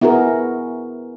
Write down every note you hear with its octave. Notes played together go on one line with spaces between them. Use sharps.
B3 E4 F#4 G#4 A#4